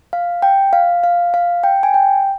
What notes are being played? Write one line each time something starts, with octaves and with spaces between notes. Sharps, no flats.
F5
G5
F5
F5
F5
G5
G#5
G5